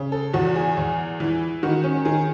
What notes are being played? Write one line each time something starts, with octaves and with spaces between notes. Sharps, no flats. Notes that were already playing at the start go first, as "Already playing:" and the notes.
Already playing: C#3
A4
E2 F#4
G#4
E2
E3
D#3 F#4
C#4
D#3 G#4